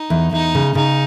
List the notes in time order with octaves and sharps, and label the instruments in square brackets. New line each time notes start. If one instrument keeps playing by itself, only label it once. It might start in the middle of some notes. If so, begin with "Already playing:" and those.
Already playing: [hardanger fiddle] D#4
[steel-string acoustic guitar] E2
[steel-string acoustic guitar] E2 [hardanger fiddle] D#4
[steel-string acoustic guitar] C#3
[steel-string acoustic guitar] C#3 [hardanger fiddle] D#4